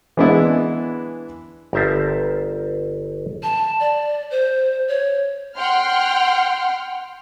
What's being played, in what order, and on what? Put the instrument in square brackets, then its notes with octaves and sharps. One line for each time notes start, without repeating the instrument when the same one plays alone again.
[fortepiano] E3 G#3 B3 D4 E4
[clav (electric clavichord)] G1 A#4 C5 E5 A5
[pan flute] A5
D5
C5
C#5
[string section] F#5 G5 C6 F6